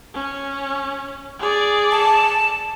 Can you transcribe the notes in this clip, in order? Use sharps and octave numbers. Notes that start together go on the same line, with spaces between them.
C#4
G#4 D5
A5